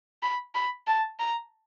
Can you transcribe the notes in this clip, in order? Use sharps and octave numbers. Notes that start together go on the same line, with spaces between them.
B5
B5
A5
A#5